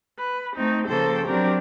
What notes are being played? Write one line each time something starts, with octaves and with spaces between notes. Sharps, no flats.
B4
A3 C4 D#4
C#3 F3 A#3 A4 C5 G5
F#3 C4 D4 G4 A#4